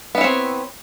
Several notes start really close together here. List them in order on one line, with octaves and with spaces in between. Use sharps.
B3 E4 C#5 C4